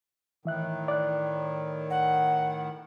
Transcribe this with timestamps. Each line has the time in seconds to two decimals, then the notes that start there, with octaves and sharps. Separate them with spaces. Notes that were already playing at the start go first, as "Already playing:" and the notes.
0.45 A2 D#3 E3 E5 F#6
0.88 D5 F#6
1.90 F#5